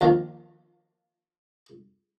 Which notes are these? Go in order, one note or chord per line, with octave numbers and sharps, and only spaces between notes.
D#2 D#3 F3